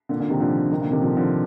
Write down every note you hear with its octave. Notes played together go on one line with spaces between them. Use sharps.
A#2 D3
A#2 D3
C3 D#3
D3 F3
C3 D#3
A#2 D3
C3 D#3
D3 F3
D3 F3